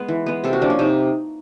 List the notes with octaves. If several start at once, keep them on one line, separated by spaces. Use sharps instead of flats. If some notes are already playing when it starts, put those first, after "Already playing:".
Already playing: G#3 B3
E3
G#3 B3
C3 A4
F#4
F3 A#3 D4
C#4
C3 D#4